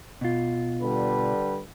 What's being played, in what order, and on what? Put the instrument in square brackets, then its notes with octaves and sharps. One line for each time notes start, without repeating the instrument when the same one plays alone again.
[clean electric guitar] B2 F4
[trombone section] D3 G3 B4